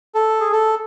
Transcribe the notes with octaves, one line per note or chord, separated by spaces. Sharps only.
A4
G#4
A4